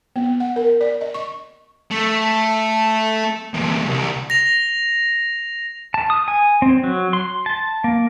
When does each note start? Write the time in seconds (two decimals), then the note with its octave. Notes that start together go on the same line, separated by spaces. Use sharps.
0.16 B3
0.40 F#5
0.56 A#4
0.81 D5
1.01 D#5
1.14 C#6
1.91 A3
3.54 E2 A#2
3.88 C2
4.30 A#6 F7
5.94 A5
6.10 D#6
6.28 G#5
6.62 C4
6.84 F#3
7.13 C6
7.46 A5
7.84 A#3